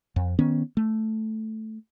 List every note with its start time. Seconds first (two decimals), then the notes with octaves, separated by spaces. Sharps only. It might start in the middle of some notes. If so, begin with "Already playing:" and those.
0.16 F2
0.39 D#3 B3 C#4
0.77 A3